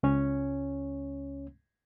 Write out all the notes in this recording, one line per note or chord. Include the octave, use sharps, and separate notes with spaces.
C#2 C#4 C#5